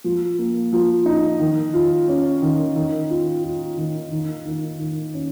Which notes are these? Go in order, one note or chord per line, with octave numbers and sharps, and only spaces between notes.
F3
A#3
F3
D#4
D#3
F4
C#4
D#3
D#3
F4
F4
D#3
D#3
D#3
D#3
C#4